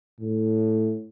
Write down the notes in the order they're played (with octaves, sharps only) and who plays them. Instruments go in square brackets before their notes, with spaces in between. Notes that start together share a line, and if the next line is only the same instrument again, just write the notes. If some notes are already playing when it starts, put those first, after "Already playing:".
[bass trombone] A2